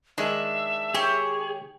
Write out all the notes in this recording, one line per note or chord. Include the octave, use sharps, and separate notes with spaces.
D#3 G#3 D4 E5
G4 G#4 C#5